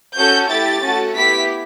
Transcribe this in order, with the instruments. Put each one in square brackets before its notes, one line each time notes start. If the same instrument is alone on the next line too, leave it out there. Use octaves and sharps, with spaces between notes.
[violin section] C#4 F#4 A4 G6
A3 E4 G4 A6
A3 C#4 F#4 A4
B3 E4 G4 B6